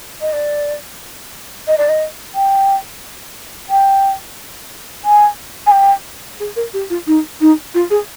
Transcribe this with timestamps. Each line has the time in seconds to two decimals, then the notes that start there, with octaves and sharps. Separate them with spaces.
0.21 D#5
0.33 D5
1.68 D#5
1.78 D5
1.89 D#5
2.35 G5
3.70 G5
5.05 G#5
5.67 G#5
5.71 G5
6.40 G#4
6.56 A#4
6.74 G4
6.90 F4
7.07 D#4
7.41 D#4
7.74 F4
7.90 G#4